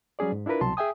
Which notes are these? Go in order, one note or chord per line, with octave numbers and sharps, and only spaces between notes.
F#3 G3 C#4 G#4 D5
G#2
D4 E4 F4 A#4 B4
C2 B2 F#3 A5 C6
G#4 E5 G5 G#5 D#6